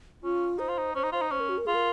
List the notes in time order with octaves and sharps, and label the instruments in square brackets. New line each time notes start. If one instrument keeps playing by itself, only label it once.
[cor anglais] C#4 [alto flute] F4
[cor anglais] D#4 [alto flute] C5
[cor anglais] F4
D#4
[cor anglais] C#4 [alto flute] C5
[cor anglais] D#4
[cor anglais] F4 [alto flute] C5
[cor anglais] D#4
[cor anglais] C#4 [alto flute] C5
[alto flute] A#4
F#4
A#4
[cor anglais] F4 [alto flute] G#4
[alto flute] A#4